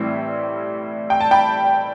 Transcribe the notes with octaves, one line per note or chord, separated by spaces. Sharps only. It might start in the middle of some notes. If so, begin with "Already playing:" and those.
Already playing: A2 E3 G3 C4 E4
G5
A5
G5 B5